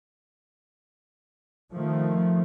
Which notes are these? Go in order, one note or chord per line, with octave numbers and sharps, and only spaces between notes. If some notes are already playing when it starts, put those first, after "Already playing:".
D#3 F3 A3